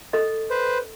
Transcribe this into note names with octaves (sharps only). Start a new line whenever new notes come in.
A4 D#5
B4 C5